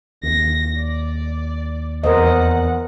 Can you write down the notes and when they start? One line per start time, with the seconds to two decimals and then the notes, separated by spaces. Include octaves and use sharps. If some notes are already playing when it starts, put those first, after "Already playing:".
0.23 D#2 A#6
0.80 D5
2.04 E2 A#4 C5 D#5 F#5